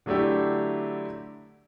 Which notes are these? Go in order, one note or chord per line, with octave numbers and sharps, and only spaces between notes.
D3 F#3 A3 D4 E4 G4